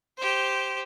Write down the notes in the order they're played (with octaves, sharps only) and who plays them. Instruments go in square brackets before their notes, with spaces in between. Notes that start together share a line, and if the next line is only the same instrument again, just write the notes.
[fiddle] G4 C5